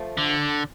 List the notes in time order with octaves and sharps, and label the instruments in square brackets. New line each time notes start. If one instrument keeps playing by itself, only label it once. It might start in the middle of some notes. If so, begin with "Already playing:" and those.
Already playing: [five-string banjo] F3 A3
[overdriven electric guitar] D3